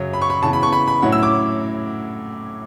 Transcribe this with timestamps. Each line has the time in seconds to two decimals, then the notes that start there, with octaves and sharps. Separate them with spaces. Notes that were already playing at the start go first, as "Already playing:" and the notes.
Already playing: F#2 C#3 F#3
0.13 B5
0.21 C#6
0.30 B5
0.43 C#3 E3 B3 A5
0.53 B5
0.63 C#6
0.72 B5
0.87 B5
1.02 A2 F#3 C#4 E4 F#5
1.12 E6
1.23 D6